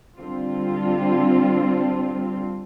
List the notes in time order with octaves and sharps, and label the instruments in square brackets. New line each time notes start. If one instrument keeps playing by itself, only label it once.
[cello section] D3 G3 C4 F4